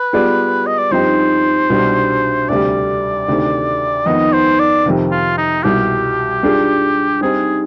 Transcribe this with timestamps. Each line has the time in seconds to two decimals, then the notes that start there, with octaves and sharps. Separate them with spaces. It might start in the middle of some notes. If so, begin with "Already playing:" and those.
Already playing: B4
0.13 G3 B3 F4 G#4 D5
0.66 D#5
0.78 D5
0.91 G2 F3 C4 D#4 G4 C5
1.70 C2 B2 G3 D4
2.49 D2 C3 G3 D5
3.28 D2 C3 D#3
4.06 F2 D#3 B3 D#4 D#5
4.33 C5
4.59 D5
4.86 F2 C3 D#3
5.11 F4
5.37 D#4
5.64 C2 B2 G3 G4
6.43 G3 D4 F4 G#4
7.21 G3 C4 D#4 G#4